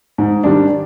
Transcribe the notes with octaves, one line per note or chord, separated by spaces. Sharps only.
G#2
D#3 G3 D4